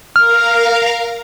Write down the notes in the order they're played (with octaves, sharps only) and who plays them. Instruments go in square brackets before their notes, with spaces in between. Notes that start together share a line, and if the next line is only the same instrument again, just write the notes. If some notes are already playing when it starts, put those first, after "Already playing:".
[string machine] A#4 F5 A#5 [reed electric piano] F6